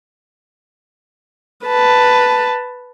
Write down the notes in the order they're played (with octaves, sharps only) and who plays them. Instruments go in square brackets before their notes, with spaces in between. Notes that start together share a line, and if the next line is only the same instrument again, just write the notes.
[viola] B4 A5